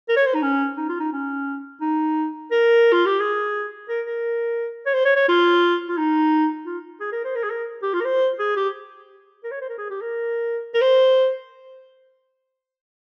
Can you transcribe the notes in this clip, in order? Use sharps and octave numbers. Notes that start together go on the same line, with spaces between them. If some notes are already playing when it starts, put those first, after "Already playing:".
A#4
C#5
C5
D#4
C#4
D#4
F4
D#4
C#4
D#4
A#4
F4
G4
G#4
A#4
A#4
C#5
C5
C#5
C#5
F4
F4
D#4
F4
G#4
A#4
C5
A#4
G#4
A#4
G4
F4
A#4
C5
G#4
G4
A#4
C#5
C5
A#4
G#4
G4
A#4
A#4
C5